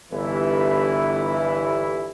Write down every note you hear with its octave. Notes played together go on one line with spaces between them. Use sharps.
G1 E3 E4